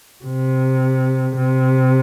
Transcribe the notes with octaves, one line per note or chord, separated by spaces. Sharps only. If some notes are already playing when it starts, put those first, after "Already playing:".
C3
C3